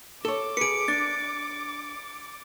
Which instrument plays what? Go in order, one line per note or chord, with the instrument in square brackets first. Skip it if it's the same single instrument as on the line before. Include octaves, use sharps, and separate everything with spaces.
[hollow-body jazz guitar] A4 C#5 [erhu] D6
[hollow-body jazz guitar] G#4 B4 [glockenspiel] C#7 D7
[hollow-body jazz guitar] D4 [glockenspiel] A6